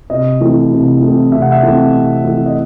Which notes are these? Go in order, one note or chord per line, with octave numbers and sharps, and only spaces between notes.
C3 D#5
E3 A3 C4
C3
E3 A3 C4
C3 E5
F#5
E5
E3 A3 C4
C3
E3 A3 C4
D#5